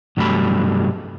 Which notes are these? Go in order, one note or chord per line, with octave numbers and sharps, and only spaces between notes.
C2 G2 F#3 G3 A3 B5